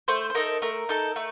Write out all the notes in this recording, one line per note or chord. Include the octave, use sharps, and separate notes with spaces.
A3 C5
C5
D#4 A4 A#4
A3 A#4
D#4 A4
A3